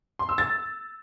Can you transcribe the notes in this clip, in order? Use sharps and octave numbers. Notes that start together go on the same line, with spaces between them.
C6
E6
A6